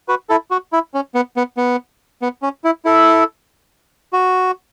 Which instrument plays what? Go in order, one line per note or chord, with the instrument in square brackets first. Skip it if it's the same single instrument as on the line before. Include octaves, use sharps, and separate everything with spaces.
[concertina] F#4 B4
E4 A4
F#4
E4
C#4
B3
B3
B3
B3
C#4
E4
E4 A4
F#4